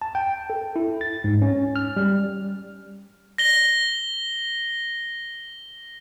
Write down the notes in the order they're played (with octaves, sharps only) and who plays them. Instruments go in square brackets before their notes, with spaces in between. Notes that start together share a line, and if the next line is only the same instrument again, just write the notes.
[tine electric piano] A5
G5
A4
E4
A6
G#2
C#4
F6
G3
[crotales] A#6 G7